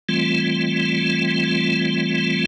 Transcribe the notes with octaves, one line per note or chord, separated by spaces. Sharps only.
E3 G3 A3 C4 F4